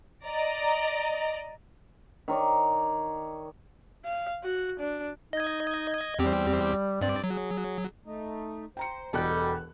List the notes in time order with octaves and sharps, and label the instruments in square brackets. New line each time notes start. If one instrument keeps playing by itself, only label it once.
[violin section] D5 D#5 A#5
[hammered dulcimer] D#3 A#4 C#5 D5
[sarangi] F5
F#4
D4
[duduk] D#4 [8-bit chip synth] D#5 G#6
[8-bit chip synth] E2 C4 G4 [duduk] G3
[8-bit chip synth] G2 D5 [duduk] C4
[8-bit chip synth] F#3 [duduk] G#4
[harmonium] A3 D#4
[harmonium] C5 [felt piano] G5 A#5 C#7
[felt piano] E1 E2 F#6 [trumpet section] G3 [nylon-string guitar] F#4 G4 A4 [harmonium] D#5